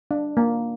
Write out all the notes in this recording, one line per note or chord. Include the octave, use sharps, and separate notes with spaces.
D4
A#3